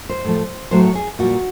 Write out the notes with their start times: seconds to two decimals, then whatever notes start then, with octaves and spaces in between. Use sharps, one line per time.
0.09 C5
0.24 A2 F3 A3
0.71 A2 F#3 A3 C5
0.83 C#5
0.95 G#4
1.19 A#2 G3 F#4